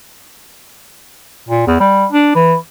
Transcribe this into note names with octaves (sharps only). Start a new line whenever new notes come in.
A#2
E2
G3
D4
E3